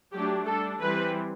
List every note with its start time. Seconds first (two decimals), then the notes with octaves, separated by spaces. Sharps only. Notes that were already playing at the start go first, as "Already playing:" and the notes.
0.13 F#3 A3 D4 G4
0.46 G3 D4 A4
0.80 E3 G3 C4 B4